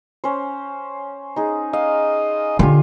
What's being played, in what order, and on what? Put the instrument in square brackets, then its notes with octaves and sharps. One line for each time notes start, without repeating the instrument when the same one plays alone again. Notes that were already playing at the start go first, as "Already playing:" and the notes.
[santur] C#4 C5
D#4 G#4
[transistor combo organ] D#5 [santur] F5
[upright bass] D3 [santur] F4 G4 G#5